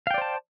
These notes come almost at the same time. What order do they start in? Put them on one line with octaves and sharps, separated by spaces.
F5 G5 D5 C5 A5